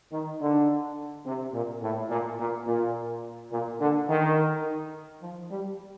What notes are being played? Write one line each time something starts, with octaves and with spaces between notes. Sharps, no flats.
D#3
D3
C3
A#2
A2
A#2
A#2
A#2
A#2
D3
D#3
F3
G3